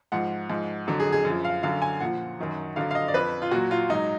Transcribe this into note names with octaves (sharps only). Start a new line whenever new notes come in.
G#2 F3 F#5
G#2 F3
F2 D3 F#3
G#4
G#4
F#2
F3
F5
F#2 D3 F#3 F5
G#5
A#2 F3 F#5
F#2 D#3 F#3
F2 D3 F#3 F5
F5
D#5
D5
F2 F3 B4
F4
A#2 F#3 F#4
F4
G#2 F#3 D#4